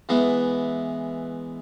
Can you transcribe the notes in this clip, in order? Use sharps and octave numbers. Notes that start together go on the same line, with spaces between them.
E3 G#3 B3